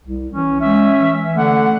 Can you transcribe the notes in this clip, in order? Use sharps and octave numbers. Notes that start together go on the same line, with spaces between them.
C2
E3 C#4
G#3 C#4 E5
E3
D3 A3 F#5